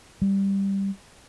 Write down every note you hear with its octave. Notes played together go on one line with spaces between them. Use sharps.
G3